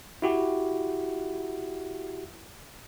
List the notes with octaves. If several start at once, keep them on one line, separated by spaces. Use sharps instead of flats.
E4 F#4 G4